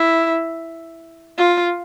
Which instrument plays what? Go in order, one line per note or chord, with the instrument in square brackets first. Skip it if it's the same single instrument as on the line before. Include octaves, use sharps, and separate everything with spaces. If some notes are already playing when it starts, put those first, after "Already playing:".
Already playing: [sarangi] E4
F4